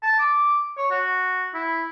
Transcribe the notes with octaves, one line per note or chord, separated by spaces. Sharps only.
A5
D6
C#5
F#4
E4